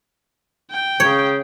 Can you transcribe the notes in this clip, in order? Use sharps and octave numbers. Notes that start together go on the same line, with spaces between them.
G5
C#3 C#5